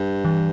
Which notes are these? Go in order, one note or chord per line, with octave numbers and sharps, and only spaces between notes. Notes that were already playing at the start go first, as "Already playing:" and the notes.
Already playing: G2
E3